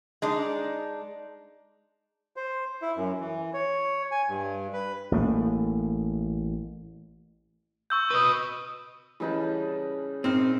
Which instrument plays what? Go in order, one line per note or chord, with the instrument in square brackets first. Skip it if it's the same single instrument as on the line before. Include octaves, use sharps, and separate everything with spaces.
[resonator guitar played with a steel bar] G#3 D4 D#4
[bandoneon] C5
E4
F#2
E3
C#5
G#5
G2
B4
[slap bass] A1 A3 A#3
[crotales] C#6 E6 G6
[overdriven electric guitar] B4 D#5
[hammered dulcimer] C#3 D#4 A5 [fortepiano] E3 G3 B4
[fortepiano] A#1 D#4 F6 [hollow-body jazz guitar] C4